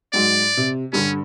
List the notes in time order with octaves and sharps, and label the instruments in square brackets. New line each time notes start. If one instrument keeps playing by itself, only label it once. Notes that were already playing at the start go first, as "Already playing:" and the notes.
[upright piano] G#2 F#3 [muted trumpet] D5
[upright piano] C3
[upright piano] G2 D3 G3 [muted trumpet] C#4